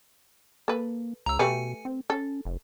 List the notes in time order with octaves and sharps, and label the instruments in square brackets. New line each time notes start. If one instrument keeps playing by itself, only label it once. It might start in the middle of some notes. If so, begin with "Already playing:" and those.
[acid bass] A#3 [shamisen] A4 B4
[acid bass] C#2 [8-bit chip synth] A#5 E6
[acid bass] B2 [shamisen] A3 G4 B4 [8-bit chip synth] G#5 C#7
[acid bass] C4
[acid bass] C#4 [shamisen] A4
[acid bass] F1